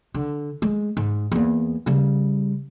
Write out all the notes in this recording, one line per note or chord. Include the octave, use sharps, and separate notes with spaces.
D3
G#3
G#2
E2 A#3
C#3 G3